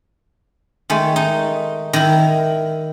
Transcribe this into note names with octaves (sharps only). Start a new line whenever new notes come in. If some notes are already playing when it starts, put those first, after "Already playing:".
D#3 G#3 A3
D#4
D#3 E4